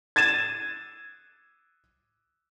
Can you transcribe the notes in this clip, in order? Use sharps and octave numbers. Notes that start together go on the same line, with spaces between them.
G#6 A6 D#7 E7